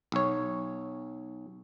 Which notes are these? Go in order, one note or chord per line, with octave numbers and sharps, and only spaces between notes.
B1 C#5